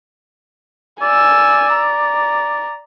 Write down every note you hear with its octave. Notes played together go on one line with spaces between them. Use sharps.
D5 G#5 E6
A#5